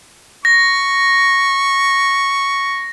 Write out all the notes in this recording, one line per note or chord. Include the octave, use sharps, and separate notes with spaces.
C#6 A#6